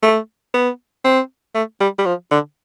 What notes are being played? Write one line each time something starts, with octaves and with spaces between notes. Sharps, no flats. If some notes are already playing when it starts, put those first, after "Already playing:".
A3
B3
C4
A3
G3
G3
F3
D3